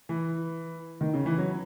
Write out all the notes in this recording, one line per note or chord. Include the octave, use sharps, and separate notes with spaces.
E3
D#3
C#3
E3
F#3